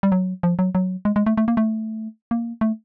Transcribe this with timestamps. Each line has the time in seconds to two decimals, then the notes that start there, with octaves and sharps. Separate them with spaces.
0.03 G3
0.12 F#3
0.43 F3
0.59 F#3
0.75 F#3
1.05 G#3
1.16 G#3
1.26 A3
1.37 A3
1.48 A#3
1.57 A3
2.31 A#3
2.61 A3